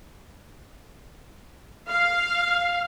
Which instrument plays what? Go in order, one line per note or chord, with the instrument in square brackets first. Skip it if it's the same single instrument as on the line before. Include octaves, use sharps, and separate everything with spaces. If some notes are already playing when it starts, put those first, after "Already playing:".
[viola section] F5